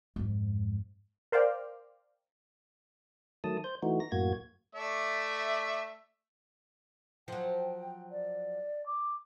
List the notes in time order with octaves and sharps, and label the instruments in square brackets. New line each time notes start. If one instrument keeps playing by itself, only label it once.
[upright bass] F2 G#2
[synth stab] A#4 C5 D5 F5 G5
[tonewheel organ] D#3 F#3 A3 A5 D#6
C5 G6
E3 A3 D#4 F#4
A#6
F#2 A2 A#3 F#4 G#6
[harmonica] A3 D5 E5
[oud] F3 F#3 [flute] G5
[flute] D5
D6